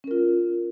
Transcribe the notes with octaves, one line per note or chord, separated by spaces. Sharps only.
C#4 F4 A#4